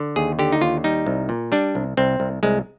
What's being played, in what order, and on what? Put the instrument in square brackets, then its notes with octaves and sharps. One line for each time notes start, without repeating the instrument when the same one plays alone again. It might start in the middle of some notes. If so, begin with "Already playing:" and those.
Already playing: [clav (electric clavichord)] D3
D#2 G#4
D3 G4
D#4
D#2 F4
G3 D#4
C2
A#2
G3 D4
C2
C2 C4
C2
C2 G#3